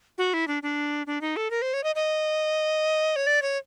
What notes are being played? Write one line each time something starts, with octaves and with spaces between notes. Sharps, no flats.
F#4
E4
D4
D4
D4
D#4
A4
A#4
C5
C#5
D#5
D#5
C#5
D5
C#5